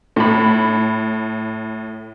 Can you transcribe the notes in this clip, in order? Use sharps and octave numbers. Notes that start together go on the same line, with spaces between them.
A2 B5